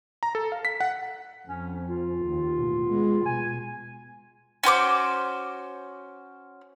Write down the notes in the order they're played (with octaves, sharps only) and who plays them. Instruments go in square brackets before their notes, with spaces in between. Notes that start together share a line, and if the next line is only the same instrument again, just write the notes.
[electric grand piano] A#5
A4
F5
B6
F#5
[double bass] F2 [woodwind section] C#4
[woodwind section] F4
[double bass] D#2
A1 B2
G#3 B3
[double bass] B2 [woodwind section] G#5
[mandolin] C#4 F#4 C5 D6